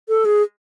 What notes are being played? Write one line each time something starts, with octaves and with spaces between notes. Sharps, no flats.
A4
G#4